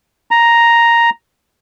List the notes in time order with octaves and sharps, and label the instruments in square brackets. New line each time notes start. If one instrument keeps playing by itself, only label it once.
[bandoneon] A#5